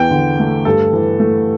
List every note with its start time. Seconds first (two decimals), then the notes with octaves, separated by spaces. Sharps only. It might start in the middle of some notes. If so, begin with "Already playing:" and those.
Already playing: E2 E3 G5
0.11 D3
0.39 A3
0.65 G2 A4
0.93 E3
1.19 A3